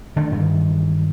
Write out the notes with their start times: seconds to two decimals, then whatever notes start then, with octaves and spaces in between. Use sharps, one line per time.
0.16 D3 D#3 A3 D4
0.32 G2 D#3 E3